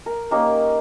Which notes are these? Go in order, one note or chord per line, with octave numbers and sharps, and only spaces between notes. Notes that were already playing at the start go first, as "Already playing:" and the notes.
A#4
A#3 C#4 D#4 G4